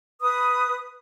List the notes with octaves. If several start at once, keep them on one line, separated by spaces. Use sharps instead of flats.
B4 D#6